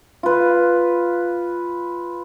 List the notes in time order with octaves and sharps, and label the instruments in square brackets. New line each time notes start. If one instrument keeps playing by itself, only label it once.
[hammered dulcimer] F4 B4